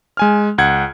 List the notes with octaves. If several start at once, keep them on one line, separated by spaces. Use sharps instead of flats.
G#3 G#5 F6
C#2 F#5 G#6